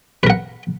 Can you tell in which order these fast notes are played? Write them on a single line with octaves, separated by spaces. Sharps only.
B4 A#4 F#5